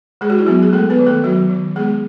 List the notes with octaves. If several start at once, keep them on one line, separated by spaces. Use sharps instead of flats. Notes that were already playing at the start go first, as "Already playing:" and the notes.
G#3 G#4
F#4
E4
F#3 B3 F#4
G#4
G#3 A3 A4
B3 B4
D#3
A3 A4
D#3 F#3 F#4
D#3
G#3 B3 G#4